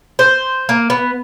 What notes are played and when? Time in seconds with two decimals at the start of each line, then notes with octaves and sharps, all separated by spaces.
0.19 C5
0.69 A#3
0.90 B3